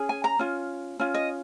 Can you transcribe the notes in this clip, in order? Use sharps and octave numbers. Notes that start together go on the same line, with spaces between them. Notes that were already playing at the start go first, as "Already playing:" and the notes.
Already playing: C#4 G#4
G#5
A#5
C#4 F4
C#4 F4
D#5